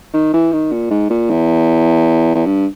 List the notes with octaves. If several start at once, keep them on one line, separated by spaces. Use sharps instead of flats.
D#3
E3
D#3
A#2
G#2
A#2
E2
E2
G2